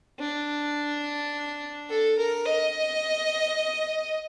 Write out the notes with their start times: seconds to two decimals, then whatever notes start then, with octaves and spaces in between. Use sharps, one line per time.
0.19 D4
1.89 A4
2.18 A#4
2.46 D#5